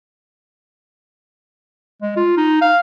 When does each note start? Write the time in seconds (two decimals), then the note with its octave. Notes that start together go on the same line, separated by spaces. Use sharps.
2.02 G#3
2.16 F4
2.37 D#4
2.61 F5